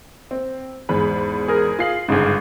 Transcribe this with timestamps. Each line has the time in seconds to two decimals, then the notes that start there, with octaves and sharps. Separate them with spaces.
0.31 C4
0.89 E2 G#2 B5
1.48 G#4 A#4
1.79 F4 C7 F#7
2.08 G1 G#2 C#3 G#3 D#4